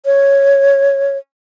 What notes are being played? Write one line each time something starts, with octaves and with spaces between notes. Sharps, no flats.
C#5